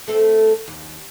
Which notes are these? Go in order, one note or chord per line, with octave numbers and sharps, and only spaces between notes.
A3 C4 A4
D#2